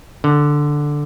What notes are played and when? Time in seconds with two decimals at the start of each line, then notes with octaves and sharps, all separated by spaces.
0.24 D3